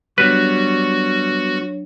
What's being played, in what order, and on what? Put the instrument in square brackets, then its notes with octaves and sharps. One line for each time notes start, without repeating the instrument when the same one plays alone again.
[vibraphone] F#3 D4 C#5 [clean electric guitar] G3 B3 [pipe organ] F#4 [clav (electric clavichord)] B4